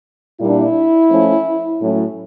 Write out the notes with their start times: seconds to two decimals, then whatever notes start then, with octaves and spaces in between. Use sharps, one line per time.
0.40 A#2 G3 A#3 D4 E4
1.11 F3 A3 C#4
1.81 A2 F#3 A3 C#4